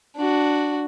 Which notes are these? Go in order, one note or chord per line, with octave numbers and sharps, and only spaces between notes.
D4 F#4